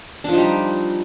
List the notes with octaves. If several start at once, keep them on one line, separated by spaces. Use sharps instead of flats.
F3 G3 D4 D#4